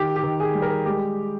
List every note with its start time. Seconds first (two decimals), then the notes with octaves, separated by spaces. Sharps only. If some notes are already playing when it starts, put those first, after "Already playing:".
Already playing: D#3 G4
0.16 G4
0.23 D#3
0.40 G#4
0.55 G3
0.62 A#4
0.85 G#3 G4